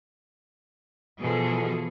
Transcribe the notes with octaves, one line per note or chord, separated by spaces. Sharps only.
B2 E3 F3 G#4 A4